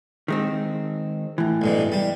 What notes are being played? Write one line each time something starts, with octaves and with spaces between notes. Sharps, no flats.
D#3 G#3 C4
A2 E3
B1 G2 B2
G3